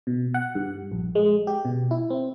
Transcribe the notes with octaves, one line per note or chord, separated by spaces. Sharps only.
B2
F#5
G2
A#1
G#3
G4
B2
E4
C4